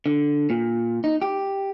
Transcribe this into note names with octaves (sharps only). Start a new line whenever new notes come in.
D3
A#2
D#4
G4